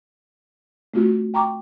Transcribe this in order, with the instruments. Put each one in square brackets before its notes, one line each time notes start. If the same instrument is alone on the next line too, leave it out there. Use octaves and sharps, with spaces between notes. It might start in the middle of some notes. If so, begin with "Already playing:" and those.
[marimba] A3 C4 F4 F#4
G5 A#5 C#6 D6